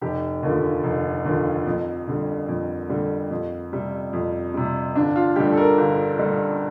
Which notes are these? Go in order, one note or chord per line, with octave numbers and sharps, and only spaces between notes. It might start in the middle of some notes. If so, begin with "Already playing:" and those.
F1 G4
D#2 D3 F3
F1
D#2 D3 F3
F2
D3 G3
F2
D3 G3
F2
C3 G3
F2
C3 G3
G1 D4
F4
G2 D3 G3 G4
A4
A#4
G1
G2 D3 G3